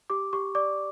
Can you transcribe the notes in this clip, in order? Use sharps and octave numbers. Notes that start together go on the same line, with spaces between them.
G4 D6
G4 C#6
D5 D6